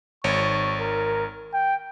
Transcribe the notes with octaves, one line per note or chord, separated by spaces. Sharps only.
G#1 C#5 C#6
A#4
G5